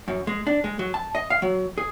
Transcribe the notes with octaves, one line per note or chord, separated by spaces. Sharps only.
F#2
G#3
D4
G#3
F#3
A5
D#5
F5
F#3
G#4